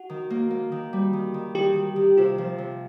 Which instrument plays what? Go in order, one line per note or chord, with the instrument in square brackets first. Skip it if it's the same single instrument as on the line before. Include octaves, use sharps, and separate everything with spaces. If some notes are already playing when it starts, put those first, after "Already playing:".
Already playing: [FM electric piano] F#4
[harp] D#3
A#3
A#3
D#3
G3
D#3
D#3
[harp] D#3 [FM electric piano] G4
[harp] D#3
D#3
[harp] C3 [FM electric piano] F4
[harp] F3
C3